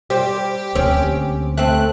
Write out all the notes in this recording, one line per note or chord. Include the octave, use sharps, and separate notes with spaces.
G3 G4 C5
D2 A#3 C4 C#4
A3 C4 F#6